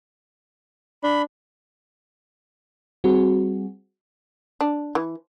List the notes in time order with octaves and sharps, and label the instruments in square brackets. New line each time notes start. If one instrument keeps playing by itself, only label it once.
[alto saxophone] D4 [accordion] B5
[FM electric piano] G3 C4 F#4 G#4
[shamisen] D4
E3